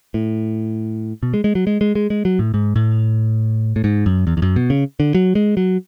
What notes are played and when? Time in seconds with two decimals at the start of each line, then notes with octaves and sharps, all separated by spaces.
0.14 A2
1.23 B2
1.34 G#3
1.44 G#3
1.55 F#3
1.67 G#3
1.81 G#3
1.95 G#3
2.10 G#3
2.25 F#3
2.39 A2
2.54 G#2
2.76 A2
3.76 A2
3.84 G#2
4.06 F#2
4.27 E2
4.37 E2
4.42 F#2
4.56 B2
4.70 C#3
5.00 D3
5.15 F#3
5.35 G#3
5.57 F#3